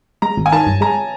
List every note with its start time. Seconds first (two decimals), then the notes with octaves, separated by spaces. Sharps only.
0.22 G#3 A#5
0.37 G#1
0.46 G#5
0.52 D#3 A5
0.67 G2
0.81 G#3 A#5